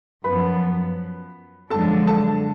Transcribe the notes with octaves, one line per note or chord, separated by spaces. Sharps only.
F#2 F3 B3 B4 B5
F#2 D3 F3 G#3 D4 A4 A5
A4 A5